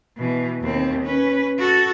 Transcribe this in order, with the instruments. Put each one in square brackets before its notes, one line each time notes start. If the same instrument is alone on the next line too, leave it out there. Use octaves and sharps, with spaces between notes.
[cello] B2 E3
D#2 C4
C#4 B4
F#4 A4